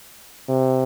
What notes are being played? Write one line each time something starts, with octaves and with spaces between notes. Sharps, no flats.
C3